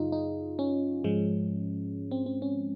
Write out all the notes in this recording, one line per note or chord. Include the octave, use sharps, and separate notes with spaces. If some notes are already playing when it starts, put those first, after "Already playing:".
Already playing: F#2 C#3 F#3 D#4 F4 G#4
D#4
C#4
G#2 F3 G#3
C4
C4
C#4